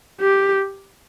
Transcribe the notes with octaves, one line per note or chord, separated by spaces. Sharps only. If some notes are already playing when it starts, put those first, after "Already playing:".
G4